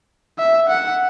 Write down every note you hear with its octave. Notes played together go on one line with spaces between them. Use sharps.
E5
F#5